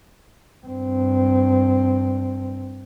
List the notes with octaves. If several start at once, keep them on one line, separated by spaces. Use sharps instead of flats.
G2 C4